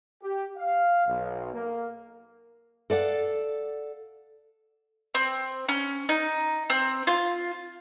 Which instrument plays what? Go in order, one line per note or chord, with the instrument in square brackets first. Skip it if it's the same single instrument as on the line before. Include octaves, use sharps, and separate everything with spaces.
[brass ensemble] G4
F5
B1
A#3
[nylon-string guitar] A4 D5 F5 F#5
[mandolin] C4
C#4
D#4
C4
F4